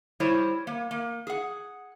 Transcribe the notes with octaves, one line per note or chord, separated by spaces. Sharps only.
G3 E4 C5 C#5
A#3
A#3
G#4 F#5